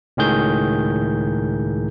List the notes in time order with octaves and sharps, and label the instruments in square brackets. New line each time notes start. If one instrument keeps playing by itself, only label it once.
[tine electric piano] C#2 A2 D#3 G#4 G6